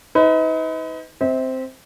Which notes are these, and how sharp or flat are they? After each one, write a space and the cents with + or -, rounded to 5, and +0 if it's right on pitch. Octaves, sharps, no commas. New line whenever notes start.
D#4 +40 B4 +35
C4 -5 E5 -35